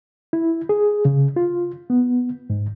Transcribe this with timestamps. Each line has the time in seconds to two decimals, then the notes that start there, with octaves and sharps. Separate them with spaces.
0.33 E4
0.69 G#4
1.05 C#3
1.36 F4
1.90 B3
2.50 G#2